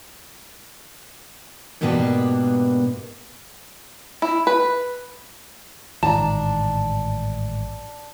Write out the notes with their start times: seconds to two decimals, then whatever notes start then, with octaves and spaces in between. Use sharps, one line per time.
1.81 G#2 B2 A#3 B3 D4 G4
4.22 E4
4.47 B4
6.03 A1 G#2 D#3 D4 A5 A#5